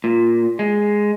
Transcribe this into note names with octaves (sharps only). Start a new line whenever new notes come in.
A#2
G#3